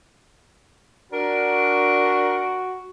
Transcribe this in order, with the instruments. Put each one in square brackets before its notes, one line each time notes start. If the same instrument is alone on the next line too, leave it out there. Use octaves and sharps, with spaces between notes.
[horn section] D4 A#4 [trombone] F#4